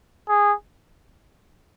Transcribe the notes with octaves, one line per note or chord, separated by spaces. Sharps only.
G#4